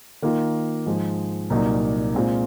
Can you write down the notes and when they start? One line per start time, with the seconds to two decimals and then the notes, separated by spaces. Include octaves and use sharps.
0.22 D#3 A#3 F4
0.86 G#2 F3 G#3
1.50 C2 A#2 F#3 A#3 D#4
2.15 A#2 G#3 C4 F4